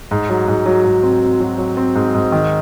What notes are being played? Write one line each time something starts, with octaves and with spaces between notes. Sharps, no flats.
G#2
F#3
G#2
F#3
G#2
C4
C4
F#3
F#3
C4
G#2
G#2
D#3